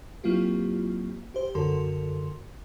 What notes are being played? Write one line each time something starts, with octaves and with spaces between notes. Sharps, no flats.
F#3 A#3 C4 E4 F4 G4
G4 C5
F#2 D3 F#4 A4 A#4 C6